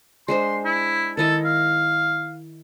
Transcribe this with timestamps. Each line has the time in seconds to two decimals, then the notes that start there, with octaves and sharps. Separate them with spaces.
0.28 G#3 D4 C5 C6
0.65 E4
1.17 D#3 E4 A4 D#5
1.45 F5